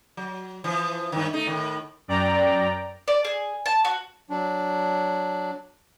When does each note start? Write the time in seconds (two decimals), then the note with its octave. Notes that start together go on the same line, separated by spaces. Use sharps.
0.17 F#3
0.64 E3 F3
1.12 G2 D#3
1.33 A3 D#4
1.46 A2 D#3
2.08 F#2 D5 G5 A#5
3.08 D5
3.25 G#4
3.66 A5
3.85 F#4
4.30 F#3 D4